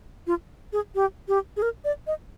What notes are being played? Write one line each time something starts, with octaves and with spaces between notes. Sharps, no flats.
F4
G#4
G4
G4
G#4
A#4
D5
D#5